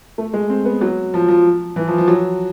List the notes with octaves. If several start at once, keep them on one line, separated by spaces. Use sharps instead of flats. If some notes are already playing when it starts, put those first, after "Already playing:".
A3
G#3
C4
B3
F#3
F3
F3
E3
F3
F3
F#3